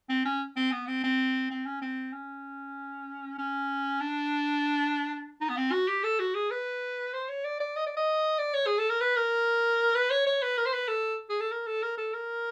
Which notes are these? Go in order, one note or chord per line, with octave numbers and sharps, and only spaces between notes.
C4
C#4
C4
B3
C4
C4
C4
C#4
C4
C#4
C#4
D4
D#4
B3
C4
F#4
G4
A4
F#4
G#4
B4
C5
C#5
D5
D5
D#5
D5
D#5
D5
C#5
G#4
A4
A#4
B4
A#4
B4
C#5
C#5
B4
A#4
C5
B4
A4
G#4
A4
A#4
A4
A#4
A4
A#4